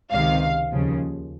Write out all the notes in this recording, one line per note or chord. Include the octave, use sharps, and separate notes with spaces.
C#2 C3 D#3 F5
D#2 C#3 F3